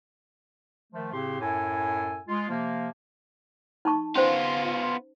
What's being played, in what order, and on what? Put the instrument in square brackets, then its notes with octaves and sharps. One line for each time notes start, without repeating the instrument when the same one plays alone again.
[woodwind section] D#3 F3 A3
A2 C#3 C4 G4 C6
F#2 A2 A4 G#5
G#3 F4
C3 F3 A#3
[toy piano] D#4 A5 C#6
[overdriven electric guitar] B3 F4 [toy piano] C#4 C5